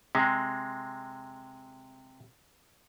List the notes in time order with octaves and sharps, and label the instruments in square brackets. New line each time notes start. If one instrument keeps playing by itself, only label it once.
[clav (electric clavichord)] C3 G#3